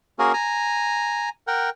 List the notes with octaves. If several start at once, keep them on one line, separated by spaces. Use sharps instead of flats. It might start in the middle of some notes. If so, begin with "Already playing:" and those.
A#3 C#4 F#4 G#4 A#4
G#5 A#5
A#4 F#5 G5